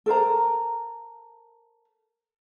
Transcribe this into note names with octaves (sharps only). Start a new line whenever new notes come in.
A4 A#4 C5 A#5